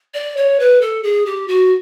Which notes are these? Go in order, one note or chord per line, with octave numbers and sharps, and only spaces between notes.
D5
C#5
B4
A4
G#4
G4
F#4